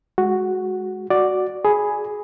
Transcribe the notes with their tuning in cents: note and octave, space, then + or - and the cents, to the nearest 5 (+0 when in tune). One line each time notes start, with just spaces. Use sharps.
G#3 +0 F#4 +0
F#4 +0 D5 +0
G#4 +10 G#5 +0 B5 +0